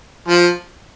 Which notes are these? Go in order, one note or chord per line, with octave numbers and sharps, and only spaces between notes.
F3